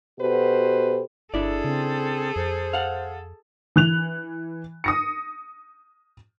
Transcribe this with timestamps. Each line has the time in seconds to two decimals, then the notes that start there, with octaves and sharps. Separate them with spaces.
0.20 B2 F#4 G4 A4 B4 C5
1.34 G1 D4 E4 G#4 A4 D5
1.64 C#3 C4
2.36 F2 C5
2.73 F5 F#5
3.76 E3 F#6 F7
4.84 D#6 A#6 C#7